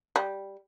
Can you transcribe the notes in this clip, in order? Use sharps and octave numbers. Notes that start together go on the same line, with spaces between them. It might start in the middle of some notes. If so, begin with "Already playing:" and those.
G3